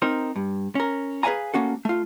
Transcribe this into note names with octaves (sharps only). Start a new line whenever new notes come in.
C4 D#4 A#4 C5
G2
C#4 A#4
G#4 B4 D5 F5 G#5 A#5
A3 A#3 C#4 F#4 A4
A3 F4